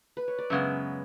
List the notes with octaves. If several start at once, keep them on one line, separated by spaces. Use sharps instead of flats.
B4
C#5
D5
F#2 C#3 G#3 B3 E5